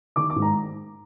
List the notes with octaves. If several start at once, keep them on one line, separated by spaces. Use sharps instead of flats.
D#3 D6
D6
G#2
A#5